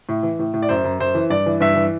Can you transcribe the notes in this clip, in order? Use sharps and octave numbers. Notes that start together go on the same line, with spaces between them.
A2
E3
A2
A2
D5
F#2 C5
F#2
F#2 C5
E3
G2 D5
E3
G2 E5
E3